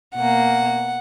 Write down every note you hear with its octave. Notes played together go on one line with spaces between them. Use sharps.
B2 A#3 F#5